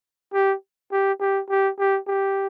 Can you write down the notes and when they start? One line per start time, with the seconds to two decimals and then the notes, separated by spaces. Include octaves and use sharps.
0.34 G4
0.92 G4
1.21 G4
1.49 G4
1.79 G4
2.07 G4